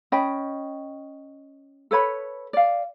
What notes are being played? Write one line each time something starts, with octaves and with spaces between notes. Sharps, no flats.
C#4 D#5 G5 B5
A4 B4 C#5 B5
D5 F5